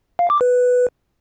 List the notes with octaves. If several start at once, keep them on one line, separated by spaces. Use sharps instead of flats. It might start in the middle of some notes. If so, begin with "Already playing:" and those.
F5
D6
B4